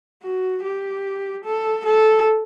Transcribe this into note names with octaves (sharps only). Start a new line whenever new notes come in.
F#4
G4
A4
A4